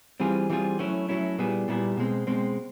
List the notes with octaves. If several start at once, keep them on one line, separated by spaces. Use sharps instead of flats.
E3 G3 C4 F4 G#4
E3 G3 C4 F4 G#4
F#3 A3 C#4 E4
F#3 A3 C#4 E4
A#2 G3 B3 E4 G#4
A#2 G3 B3 E4 G#4
B2 G#3 C4
B2 G#3 C4